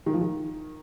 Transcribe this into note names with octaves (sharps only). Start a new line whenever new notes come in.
D#3
F3
D#3